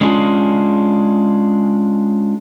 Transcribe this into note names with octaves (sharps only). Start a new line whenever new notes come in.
G#3 C#4 D4 F4 G#4